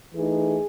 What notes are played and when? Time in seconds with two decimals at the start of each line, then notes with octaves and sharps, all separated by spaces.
0.13 E3 A3 D#4 G#4